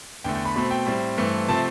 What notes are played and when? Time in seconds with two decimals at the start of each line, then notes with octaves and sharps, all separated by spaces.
0.24 E2 D3 A3 G5
0.35 G5
0.45 B5
0.56 B2 A3 C4 B5
0.71 G5
0.86 A2 G3 C4
1.18 G2 E3 A3 C4
1.48 C3 F3 A3 C4 A5